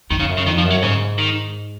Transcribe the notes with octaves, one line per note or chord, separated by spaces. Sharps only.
F2 D#3
C#3
F#2
C#3
F2 D#3
F3
F#2
F#3
G#2 C#3
D#3